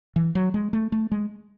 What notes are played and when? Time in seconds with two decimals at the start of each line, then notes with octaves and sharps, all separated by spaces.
0.16 E3
0.35 F#3
0.54 G#3
0.73 A3
0.92 A3
1.11 G#3